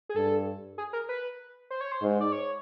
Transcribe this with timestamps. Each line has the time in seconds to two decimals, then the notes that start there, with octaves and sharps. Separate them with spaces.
0.09 G#4
0.16 G2 A4
0.78 G#4
0.93 A#4
1.09 B4
1.70 C5
1.81 C#5
1.92 C5
2.01 G#2
2.20 D5
2.32 C#5